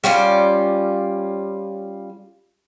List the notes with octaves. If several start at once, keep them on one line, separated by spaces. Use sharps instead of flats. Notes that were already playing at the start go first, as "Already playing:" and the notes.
G3 C#4 F4 D5